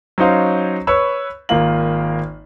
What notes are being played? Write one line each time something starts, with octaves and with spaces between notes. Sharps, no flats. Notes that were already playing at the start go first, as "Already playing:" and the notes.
F#3 C#4 D#4 C5 F5
B4 C#5 B5 C#6 E6
G#1 A#3 F4 F#7